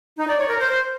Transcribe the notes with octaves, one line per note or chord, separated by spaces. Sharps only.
D#4
D5
C#5
A#4
C5